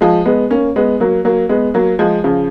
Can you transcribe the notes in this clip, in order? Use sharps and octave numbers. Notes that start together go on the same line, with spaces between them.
F3 G#3
G#3 B3
A#3 C#4
G#3 B3
F#3 A#3
F#3 A#3
G#3 B3
F#3 A#3
F3 G#3
C#3 F3